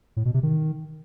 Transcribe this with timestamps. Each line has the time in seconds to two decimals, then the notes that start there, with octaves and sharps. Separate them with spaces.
0.17 A2
0.25 B2
0.34 C3
0.43 D#3